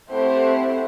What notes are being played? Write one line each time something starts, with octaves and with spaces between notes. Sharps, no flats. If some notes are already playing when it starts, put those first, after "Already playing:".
A3 C4 E4 G4 C5 F#5